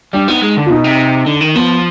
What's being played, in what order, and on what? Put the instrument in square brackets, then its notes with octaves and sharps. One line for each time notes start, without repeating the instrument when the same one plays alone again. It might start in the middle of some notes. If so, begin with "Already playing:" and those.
[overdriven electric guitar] G3 [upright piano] D4
[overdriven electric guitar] B3 [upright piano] D#4
[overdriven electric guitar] G#3
D3
[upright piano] F4
[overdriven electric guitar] B2 [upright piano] D#4
[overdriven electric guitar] C3
D3
D#3
[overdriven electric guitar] F3 [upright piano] B3